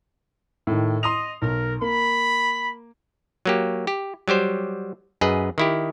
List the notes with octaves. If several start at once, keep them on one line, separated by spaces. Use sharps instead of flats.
A2 D#3
D#5 C6 D#6 F7
B1 A#4
A#3 B5
F#3 A#3 G4
G4
F#3 G3 G4 C5
F#2 G#4 B4 D#5
D#3 E4 G4